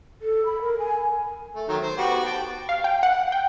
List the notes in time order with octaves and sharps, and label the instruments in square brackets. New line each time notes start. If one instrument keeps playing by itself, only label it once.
[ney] A4
B5
A#4
G#5
[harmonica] A3
D#3 F#3 A3
C5
B3 F#4 G4
G5 A5
[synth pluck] F5
G5
F#5
G5